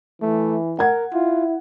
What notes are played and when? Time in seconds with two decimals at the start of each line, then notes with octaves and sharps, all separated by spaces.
0.22 E3 A3
0.79 A#4 F#5 G#6
1.14 E4 F4